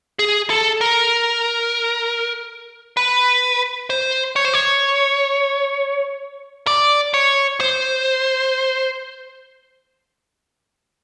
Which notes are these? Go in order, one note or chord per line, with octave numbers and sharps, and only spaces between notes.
G#4
A4
A#4
B4
C5
C#5
C5
C#5
D5
C#5
C5